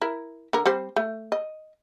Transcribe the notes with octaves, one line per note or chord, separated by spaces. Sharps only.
E4 A#4
D3 A#4
G3 C4 C5
A3
D#5